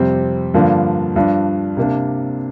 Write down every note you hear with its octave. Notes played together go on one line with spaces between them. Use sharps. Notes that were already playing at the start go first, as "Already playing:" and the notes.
Already playing: F2 C3 G3 C4
G2 D3 F3 A#3 D4
G2 F3 D4
C3 A#3 D4